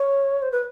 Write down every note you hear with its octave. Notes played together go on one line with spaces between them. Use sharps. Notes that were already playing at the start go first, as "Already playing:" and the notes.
Already playing: C#5
C5
B4